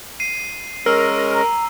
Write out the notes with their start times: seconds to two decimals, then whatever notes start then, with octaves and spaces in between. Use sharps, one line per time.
0.20 C7 D#7
0.86 G#3 C#4 A#4 E6
1.34 A#5